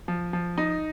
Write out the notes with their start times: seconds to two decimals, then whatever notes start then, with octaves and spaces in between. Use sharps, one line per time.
0.08 F3
0.33 F3
0.58 D#4